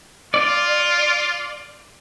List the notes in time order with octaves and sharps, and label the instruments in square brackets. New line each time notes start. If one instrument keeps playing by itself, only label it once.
[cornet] F4 [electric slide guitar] D5